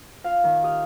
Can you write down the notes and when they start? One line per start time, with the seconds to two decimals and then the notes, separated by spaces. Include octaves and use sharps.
0.24 F4 F5
0.44 D#3
0.63 G4 D#6 F6